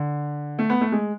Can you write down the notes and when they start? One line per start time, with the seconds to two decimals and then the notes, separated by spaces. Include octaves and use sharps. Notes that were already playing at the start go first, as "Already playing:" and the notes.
Already playing: D3
0.59 A3
0.70 B3
0.81 A3
0.92 G#3